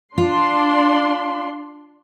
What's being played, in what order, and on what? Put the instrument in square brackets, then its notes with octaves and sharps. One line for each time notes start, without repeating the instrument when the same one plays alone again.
[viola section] D4 C6 [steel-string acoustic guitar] F4